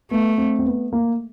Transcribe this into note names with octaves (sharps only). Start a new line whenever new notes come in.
A3 B3
C4
C4
B3
A#3